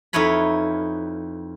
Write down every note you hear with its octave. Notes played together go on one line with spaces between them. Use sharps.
F2 D#4 E4 B4 C#5 B5